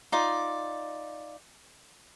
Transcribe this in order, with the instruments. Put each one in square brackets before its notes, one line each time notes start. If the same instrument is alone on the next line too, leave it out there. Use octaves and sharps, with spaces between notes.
[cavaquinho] D#4 F4 D5